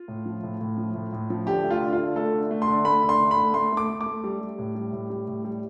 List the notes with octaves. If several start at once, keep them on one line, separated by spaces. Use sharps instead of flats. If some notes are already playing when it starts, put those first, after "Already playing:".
Already playing: F4
A2
F3
A2
A2
F3
A2
A2
F3
D3 G4
A3
F4
D3
F4
D3
A3 A4
D3
A3
C6
D3
A3 B5
D3
C6
D3
B5
A3
A3 C6
A3 D6
A3
D6
A3
G3
G3
A2
G3
A2
G3
A2
G3